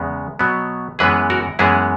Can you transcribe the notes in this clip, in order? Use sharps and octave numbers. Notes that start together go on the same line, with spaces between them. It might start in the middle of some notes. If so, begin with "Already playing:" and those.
Already playing: E2 C#3 G#3 B3
B2 F#3 B3
F#2 E3 G#3 B3 G#4 B4
F#4 A#4
F#2 E3 G#3 B3 E4 G#4